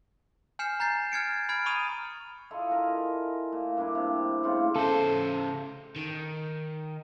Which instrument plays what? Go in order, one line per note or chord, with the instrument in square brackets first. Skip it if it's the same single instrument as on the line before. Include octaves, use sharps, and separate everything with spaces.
[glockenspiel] G#5 F6 G6 C7 C#7 E7
A#5 G6 A6 C7
F6 G#6 C#7 D7
B5 F6 G#6 D7
A#5 B5 C#6 D#6 D#7 F7
[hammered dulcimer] E4 F4 A4 D#5
A#4 G#5
A#2
G2 A#2 D4 E4
C3
A2 C#3 C4 F4
[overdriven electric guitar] C#3 C5 [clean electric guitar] A4
[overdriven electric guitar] D#3